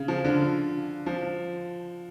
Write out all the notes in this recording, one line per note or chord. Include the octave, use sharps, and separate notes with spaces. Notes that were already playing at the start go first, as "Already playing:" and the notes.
Already playing: C#3
F3
D3
F3